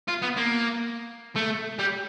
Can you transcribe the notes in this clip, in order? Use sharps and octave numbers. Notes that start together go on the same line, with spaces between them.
F4
B3
A#3
A3
G3